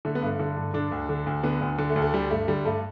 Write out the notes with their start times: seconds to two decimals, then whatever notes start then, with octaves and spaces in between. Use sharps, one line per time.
0.05 D3 A3
0.15 B3
0.22 G2 A3
0.39 D3
0.57 G2
0.74 D3 D4
0.92 D2
1.09 D3
1.26 D2
1.43 D3 B3
1.61 D2
1.79 D3
1.90 A3
1.96 D2
2.02 A3
2.13 D3 G3
2.31 G2 A3
2.48 D3 G3
2.65 G2 A3